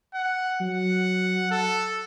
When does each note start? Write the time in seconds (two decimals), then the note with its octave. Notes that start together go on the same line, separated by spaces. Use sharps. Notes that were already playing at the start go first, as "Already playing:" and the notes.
0.14 F#5
0.61 F#3 F#5
1.51 A4